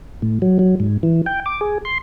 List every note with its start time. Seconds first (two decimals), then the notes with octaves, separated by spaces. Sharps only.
0.22 A2
0.42 F#3
0.59 F#3
0.80 G#2
1.03 E3
1.26 G5
1.46 D6
1.61 G#4
1.85 C6